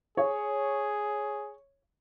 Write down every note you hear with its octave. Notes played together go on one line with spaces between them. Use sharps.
G#4 C#5